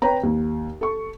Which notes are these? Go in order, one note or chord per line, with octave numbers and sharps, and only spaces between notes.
B4 C#5 G5 A#5
D#2
A4 C#6